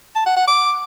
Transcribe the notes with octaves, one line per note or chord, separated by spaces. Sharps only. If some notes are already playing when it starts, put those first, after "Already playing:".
A5
F#5
F#5
D6